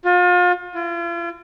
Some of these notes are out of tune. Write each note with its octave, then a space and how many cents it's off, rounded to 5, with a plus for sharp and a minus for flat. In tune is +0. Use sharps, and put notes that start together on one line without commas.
F4 +35
F4 -45